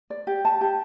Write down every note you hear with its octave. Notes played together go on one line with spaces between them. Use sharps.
D5
G4
A5
G4